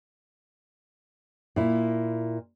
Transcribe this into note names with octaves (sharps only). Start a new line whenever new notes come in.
A#2 E4